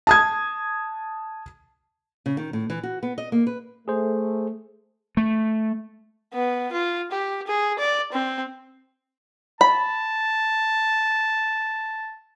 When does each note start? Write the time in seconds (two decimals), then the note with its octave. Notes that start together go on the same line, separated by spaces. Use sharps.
0.07 A5 D#6 G#6
2.26 C#3
2.37 D#3
2.53 A2
2.70 E3
2.83 F#4
3.03 B3
3.18 D#5
3.32 A#3
3.47 B4
3.88 A3 G#4 C5
5.17 A3
6.34 B3
6.72 F4
7.11 G4
7.47 G#4
7.79 D5
8.12 C4
9.61 A5 B5